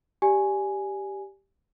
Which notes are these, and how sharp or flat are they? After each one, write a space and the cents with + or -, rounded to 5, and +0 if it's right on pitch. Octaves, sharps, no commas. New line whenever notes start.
G4 +0 D5 +0 G#5 +0